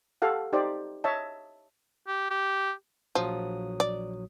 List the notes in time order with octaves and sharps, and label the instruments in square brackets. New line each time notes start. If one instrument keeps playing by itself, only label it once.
[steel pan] G4 A4 F5 F#5
D#4 G4 C5 D5
C#5 D#5 E5 A5
[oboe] G4
G4
[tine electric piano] A#1 F#3 D#6 [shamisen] F3
[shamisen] D5